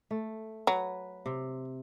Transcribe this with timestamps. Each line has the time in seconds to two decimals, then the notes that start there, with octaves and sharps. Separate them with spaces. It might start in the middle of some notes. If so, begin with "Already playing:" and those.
0.11 A3
0.67 F#3 B4
1.26 C3